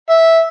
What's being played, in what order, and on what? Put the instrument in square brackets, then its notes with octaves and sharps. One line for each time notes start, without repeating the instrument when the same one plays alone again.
[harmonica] E5